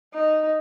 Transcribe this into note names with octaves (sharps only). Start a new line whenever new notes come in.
D#4